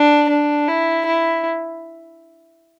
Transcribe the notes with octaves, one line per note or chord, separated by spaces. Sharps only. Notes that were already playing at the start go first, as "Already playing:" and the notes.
Already playing: D4
D4
E4
E4